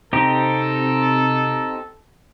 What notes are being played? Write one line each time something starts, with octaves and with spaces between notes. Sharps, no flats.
C3 C4 D#4 G4 A4